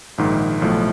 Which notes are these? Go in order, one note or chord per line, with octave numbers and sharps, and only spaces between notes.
A#1 G#2 D#3
B1 A2 F3 A3